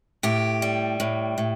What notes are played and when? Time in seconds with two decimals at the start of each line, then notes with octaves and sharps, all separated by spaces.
0.23 A2 G4
0.62 G3
1.00 A2
1.38 A2